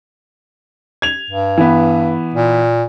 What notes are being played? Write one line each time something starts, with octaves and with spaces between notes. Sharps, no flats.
G#6 F7
G2
E3 B3
A#2